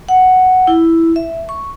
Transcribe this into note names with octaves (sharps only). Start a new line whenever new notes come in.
F#5
E4
E5
C#6